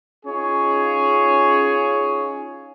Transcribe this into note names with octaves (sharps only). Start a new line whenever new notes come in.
C#4 D#4 F4 G#4 C#5